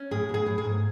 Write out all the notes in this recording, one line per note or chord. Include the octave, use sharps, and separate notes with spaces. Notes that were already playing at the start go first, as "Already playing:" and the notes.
Already playing: C#4
A2 G#4
B2 G#4
A2
G#4
G#2